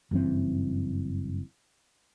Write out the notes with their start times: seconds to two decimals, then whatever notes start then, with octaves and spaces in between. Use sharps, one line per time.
0.11 F#1 G2 E3 C4